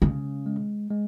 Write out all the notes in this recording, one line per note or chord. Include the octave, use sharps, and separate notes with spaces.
C#3 G#3
G#3
G#3